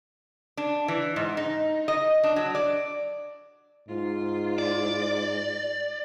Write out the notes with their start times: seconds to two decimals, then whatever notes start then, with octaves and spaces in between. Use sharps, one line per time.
0.57 D4
0.88 E3
1.16 G#2
1.37 D#4
1.88 D#5
2.23 D4
2.36 F#3
2.55 D5
3.89 G#2 F4
4.59 D5